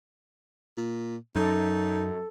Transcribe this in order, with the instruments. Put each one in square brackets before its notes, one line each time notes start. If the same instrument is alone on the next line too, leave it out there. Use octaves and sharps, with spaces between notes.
[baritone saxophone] A#2
[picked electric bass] F#2 [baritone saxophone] D#4 [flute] A4